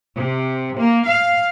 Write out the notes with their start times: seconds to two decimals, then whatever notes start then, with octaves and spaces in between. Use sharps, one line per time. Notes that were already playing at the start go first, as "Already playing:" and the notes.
0.16 C3
0.77 A#3
1.06 F5